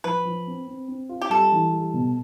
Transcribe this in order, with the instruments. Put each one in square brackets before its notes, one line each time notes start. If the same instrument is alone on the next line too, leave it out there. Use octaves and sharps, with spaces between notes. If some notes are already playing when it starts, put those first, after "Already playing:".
[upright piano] F3 [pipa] B4
[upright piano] F3
C4
C4
C4
F4
[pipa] G4
[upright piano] G3 [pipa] A4
[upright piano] E3
G3
B2